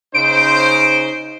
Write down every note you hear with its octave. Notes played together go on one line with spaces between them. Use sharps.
C#3 D#4 C5 D7